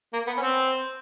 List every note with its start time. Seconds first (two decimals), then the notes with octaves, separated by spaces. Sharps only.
0.13 A#3
0.27 B3
0.37 C#4
0.42 C4